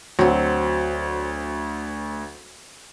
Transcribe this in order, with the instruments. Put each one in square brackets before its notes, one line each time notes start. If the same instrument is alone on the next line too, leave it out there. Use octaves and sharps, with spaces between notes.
[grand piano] D2 [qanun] F#3 C4